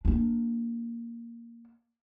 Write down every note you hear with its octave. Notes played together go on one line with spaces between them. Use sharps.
A#3 D4